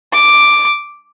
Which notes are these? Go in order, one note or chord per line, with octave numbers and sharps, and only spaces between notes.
D6